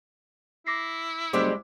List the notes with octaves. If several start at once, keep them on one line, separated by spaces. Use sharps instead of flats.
E4 D6 A#6 C7
F#1 G3 G#3 C4 C5 D6